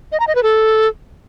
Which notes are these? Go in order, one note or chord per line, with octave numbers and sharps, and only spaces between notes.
D#5
A#5
D#5
B4
A4